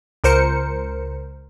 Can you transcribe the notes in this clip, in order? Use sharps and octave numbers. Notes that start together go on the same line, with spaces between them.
C#2 A#4 C5 C#7